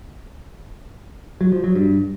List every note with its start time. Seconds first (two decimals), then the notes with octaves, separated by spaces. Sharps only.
1.41 F#3
1.52 F3
1.64 F#3
1.75 G2